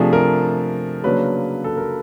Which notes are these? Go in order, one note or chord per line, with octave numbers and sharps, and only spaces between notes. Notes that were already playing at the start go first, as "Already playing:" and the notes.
Already playing: C3 F3 A3 D4 G#4
A#4
C#3 F#3 A#3 D4 B4
A4
A#4